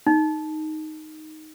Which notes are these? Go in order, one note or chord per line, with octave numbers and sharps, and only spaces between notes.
D#4